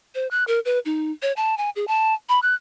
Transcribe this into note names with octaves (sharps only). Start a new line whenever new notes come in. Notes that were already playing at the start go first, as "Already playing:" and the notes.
C5
F#6
A#4
B4
D#4
C#5
A5
G#5
G#4
A5
B5
F#6